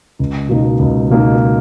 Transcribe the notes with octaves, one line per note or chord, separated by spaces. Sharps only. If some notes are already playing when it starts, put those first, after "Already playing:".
C#2
B2 A#3 D#4
C#2
B2 A#3 D#4